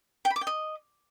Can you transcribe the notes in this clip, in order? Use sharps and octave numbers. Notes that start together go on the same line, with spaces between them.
G5
B5
D6
G5
D#5